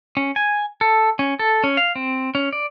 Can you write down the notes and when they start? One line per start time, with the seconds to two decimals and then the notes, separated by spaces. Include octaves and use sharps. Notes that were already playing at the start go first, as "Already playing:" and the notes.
0.17 C#4
0.36 G#5
0.81 A4
1.19 C#4
1.39 A4
1.64 C#4
1.77 F5
1.95 C4
2.35 C#4
2.53 D5